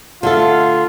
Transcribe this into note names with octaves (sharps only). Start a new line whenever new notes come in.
D3 A3 F4 A4